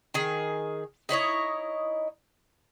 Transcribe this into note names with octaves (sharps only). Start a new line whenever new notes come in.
D#3 G#4
D#4 E4 C#5 D#5